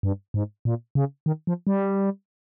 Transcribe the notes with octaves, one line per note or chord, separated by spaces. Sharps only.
G2
G#2
A#2
C#3
D#3
F3
G3